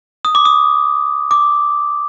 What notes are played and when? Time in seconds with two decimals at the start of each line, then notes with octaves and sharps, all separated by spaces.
0.25 D#6
0.35 D6
0.45 D#6
1.31 D6